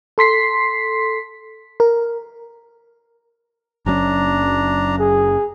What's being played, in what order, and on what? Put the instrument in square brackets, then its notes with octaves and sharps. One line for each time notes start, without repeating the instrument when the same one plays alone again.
[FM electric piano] A4 C6 B6 C7
A#4
[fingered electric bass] F#1 F#3 C#4 [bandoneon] D4 A#5
[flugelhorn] G#4